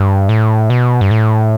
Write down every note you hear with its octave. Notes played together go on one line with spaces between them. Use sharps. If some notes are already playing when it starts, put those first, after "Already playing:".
Already playing: G2
A2
B2
G2
A2